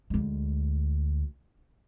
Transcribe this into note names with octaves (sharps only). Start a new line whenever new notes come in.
D2 G#3